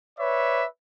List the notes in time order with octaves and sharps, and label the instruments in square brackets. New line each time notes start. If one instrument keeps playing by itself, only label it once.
[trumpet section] B4 C#5 D5 E5